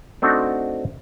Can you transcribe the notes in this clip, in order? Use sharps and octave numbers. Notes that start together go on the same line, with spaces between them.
A3 C4 D4 D#4 F#4 A4